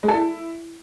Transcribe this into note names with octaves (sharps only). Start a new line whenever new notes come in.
G#3
A4
E4